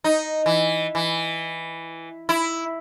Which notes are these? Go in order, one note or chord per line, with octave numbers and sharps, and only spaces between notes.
D#4
E3
E3
E4